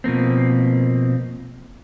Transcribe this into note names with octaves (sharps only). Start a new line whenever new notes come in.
B2 F3 A#3 C4